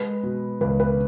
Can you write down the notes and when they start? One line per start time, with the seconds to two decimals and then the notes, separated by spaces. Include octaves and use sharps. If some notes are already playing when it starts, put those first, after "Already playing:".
Already playing: G#3 B4
0.23 B2
0.61 C#2 B4
0.80 B4